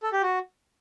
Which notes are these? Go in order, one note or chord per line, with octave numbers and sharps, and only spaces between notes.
A4
G4
F#4